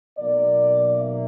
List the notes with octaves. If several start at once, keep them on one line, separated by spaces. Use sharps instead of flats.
B1 B2 F#3 A#3 D5
E5